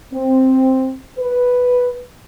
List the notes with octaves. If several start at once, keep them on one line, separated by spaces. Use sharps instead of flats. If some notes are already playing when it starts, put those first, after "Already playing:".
C4
B4